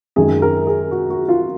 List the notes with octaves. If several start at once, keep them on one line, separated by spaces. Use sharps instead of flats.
F#2 D#3 G#3 G#4
A#4
G#4
F#4
F#4
F4